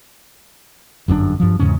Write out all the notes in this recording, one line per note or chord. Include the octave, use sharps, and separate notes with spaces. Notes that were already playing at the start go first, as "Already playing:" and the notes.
G1 F#2 C#3 D4
G2 F3
E2 G#2 C#3 C#4